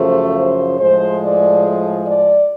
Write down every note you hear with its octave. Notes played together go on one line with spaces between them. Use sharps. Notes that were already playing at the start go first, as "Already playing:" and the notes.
Already playing: F#2 C#3 F3 A3 C5
C5
A2 F3 G#3 C5
D5
D5